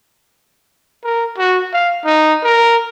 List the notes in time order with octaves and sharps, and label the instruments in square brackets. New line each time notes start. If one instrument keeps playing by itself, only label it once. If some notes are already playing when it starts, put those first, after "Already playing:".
[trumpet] A#4
F#4
F5
D#4
A#4